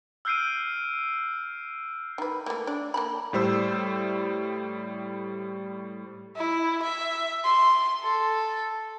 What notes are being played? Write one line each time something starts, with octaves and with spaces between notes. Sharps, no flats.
E6 F6 G6 C7 D7 D#7
D#3 B4
A3 A#3
D4
A#3 A5 B5
A2 G3 C5 E6
E4
E5
C6
A4